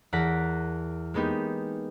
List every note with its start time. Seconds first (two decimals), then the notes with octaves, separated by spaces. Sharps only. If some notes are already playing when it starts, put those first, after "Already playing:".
0.13 E2 A#4 F#5 A5 A#6 B6
1.14 G#3 A#3 B3 D#4 G4